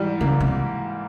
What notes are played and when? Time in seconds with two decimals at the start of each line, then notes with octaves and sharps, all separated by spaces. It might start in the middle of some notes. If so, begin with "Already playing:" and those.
Already playing: G#2 E3 G3
0.21 C#3 A#3
0.40 C3